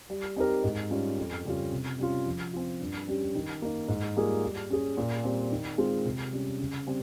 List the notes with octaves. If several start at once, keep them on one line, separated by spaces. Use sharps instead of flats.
G3
C4 D#4 G4 A#4
G#2
G3 C#4 F4
F2
C#3 G3 C#4 F4
C3
G3 C#4 F4
F3
C4 F4
G2
G3 C#4 G4
D#3
A#3 D#4
G#2
G3 A#3 F4 G#4
G3
C#4 G#4
A#2
G3 C4
D#3
G#3 C4 F4 G#4
C3
G3 C#4
C#3
G3 C4